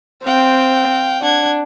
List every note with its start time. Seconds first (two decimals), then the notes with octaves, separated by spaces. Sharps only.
0.25 C4 F5 G5
1.22 D4 F#5 G#6